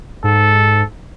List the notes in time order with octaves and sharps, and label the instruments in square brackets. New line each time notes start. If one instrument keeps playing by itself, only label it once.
[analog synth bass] G#2 [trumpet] A4